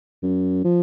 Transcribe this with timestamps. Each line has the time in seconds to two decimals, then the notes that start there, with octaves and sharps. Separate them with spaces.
0.23 F#2
0.64 F3